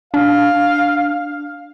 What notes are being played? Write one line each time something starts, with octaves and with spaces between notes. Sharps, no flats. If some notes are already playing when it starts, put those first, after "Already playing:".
D4 F5